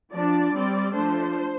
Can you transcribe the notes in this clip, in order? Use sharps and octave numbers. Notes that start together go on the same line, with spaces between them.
F3 D4 D5
G3 C4
F3 A3 D4 C5